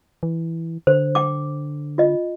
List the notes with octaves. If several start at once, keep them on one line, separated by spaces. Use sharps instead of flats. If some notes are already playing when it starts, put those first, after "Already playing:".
E3
D3 C5
G5 D6
F4 D#5